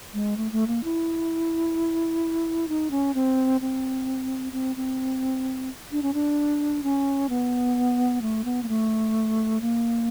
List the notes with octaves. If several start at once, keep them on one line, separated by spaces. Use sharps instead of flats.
G#3
A3
A3
A#3
E4
D#4
C#4
C4
C4
C4
C4
D4
C#4
D4
C#4
B3
A3
B3
A#3
A3
A#3